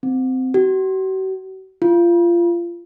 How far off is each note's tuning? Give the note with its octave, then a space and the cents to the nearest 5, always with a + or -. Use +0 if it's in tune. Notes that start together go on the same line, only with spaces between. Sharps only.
C4 -20
F#4 +45
F4 -25